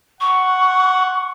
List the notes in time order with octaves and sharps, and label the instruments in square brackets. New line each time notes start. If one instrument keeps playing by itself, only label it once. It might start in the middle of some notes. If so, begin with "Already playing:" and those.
[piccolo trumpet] F#5 [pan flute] C#6